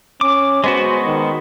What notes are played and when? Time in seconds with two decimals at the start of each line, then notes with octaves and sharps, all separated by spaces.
0.21 C#4 D6
0.64 G#3 B3 F#4 C5
1.05 D#3